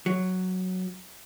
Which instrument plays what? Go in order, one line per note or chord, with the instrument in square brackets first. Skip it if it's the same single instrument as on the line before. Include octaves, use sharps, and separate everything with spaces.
[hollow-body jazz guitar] F#3